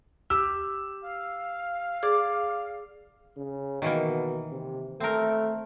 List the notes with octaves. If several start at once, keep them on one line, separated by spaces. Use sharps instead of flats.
G4 E6 F6
F5
G#4 D5
C#3
B2 D#3 E3 A#3
C3
A3 C4 A#4